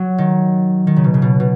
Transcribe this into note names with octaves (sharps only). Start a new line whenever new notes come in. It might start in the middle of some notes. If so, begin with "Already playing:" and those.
Already playing: F#3
D#3
D#3
C#3
B2
C#3
B2
B2